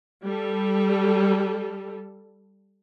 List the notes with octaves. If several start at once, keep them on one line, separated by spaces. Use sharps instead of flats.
G3 A4